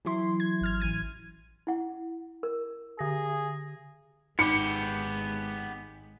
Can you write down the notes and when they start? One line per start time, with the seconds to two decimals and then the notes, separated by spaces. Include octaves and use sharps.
0.05 E3 F#3 E4 C6
0.40 G#6
0.61 G#1 F6 G#6
0.80 A1 E3 G#6 D#7
1.67 E4 F#5
2.43 A#4
2.99 D3 G#4 A#6
4.39 G#1 G#3 B3 D#4 G4 B5 D6 C#7